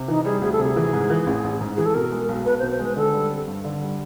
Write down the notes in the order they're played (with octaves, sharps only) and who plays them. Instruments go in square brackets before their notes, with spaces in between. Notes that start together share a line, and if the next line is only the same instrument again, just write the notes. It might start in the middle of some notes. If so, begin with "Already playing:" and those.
Already playing: [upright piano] C3
[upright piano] E3 [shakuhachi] D#4
[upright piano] G3 [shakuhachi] G#4
[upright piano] D2 [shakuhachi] G#4
[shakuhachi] A4
[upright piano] C3 [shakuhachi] G#4
[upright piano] E3
G#2
E3
A1
A1
G#2
[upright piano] E3 [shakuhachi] G#4
[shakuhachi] A4
[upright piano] B2 [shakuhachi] A#4
[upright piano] G#3
B1
[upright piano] B1 [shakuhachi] B4
[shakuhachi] C5
[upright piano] B2
[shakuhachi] C5
[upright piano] G#3 [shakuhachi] B4
[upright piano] D3 [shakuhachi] A4
[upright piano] G3
C4
G2
D3
G3